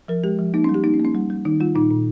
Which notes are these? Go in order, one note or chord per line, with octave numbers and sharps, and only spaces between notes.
F3 A#4
G#3 G4
F3
A#3 D#4
C#4
G3
G4
A#3 D#4
C#4
A#3
C#4
G3
G3
D#3 D#4
G3 F4
A#2 D#4
A#2